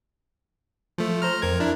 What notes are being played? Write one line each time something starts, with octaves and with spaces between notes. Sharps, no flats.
F3 A3
C5 A#5 F6
F2 A#4 G#6
D4 E4